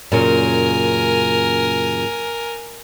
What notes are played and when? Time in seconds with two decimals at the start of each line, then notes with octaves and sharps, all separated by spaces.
0.12 F#2 A#2 C#3 A#4 G#5